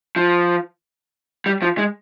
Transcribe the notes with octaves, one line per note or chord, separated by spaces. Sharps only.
F3
G3
F3
G#3